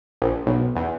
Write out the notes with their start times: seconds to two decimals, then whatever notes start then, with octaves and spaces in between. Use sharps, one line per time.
0.22 A#1
0.47 B1
0.76 E2